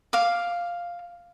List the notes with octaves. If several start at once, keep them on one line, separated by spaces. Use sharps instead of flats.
F5 D6